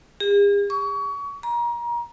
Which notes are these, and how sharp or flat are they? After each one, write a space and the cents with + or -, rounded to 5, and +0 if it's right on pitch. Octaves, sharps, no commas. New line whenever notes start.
G#4 -45
C#6 +30
A#5 +30